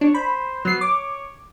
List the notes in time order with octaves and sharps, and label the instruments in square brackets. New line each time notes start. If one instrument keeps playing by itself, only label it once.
[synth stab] D4 [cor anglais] C#5
[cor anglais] C5 [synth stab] B5
[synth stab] F#3 C7 [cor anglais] B3
[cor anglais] C#5 [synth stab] D6